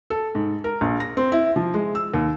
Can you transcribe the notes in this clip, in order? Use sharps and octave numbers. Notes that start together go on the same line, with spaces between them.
A4
G#2
A#4
A#1
A#6
C4
E4
F3
G#3
E6
D#2